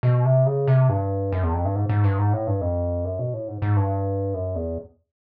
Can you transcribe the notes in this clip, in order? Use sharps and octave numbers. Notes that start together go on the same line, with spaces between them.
B2
C3
C#3
C3
G2
F#2
E2
F2
G2
G#2
G#2
G2
G#2
A2
G2
F2
F#2
B2
A2
G#2
G#2
G2
F#2
E2